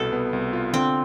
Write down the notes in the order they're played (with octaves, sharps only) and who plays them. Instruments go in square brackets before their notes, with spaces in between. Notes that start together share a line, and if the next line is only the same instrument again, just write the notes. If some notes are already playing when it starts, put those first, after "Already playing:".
Already playing: [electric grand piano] C2 B2 [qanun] A4
[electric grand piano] B3
C2
F4
[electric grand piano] D3 [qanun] C4